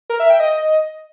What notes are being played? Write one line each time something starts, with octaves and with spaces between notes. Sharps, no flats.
A#4
E5
G5
D#5